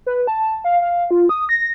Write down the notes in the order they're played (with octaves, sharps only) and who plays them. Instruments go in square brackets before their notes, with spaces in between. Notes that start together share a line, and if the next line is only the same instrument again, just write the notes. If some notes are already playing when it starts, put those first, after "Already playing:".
[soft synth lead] B4
A5
F5
F5
F4
D#6
A#6